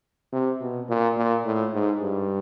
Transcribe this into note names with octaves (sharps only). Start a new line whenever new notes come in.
C3
B2
A#2
A#2
A2
G#2
G2